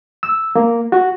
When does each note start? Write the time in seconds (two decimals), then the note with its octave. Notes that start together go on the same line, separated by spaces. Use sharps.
0.23 E6
0.55 A#3
0.92 F#4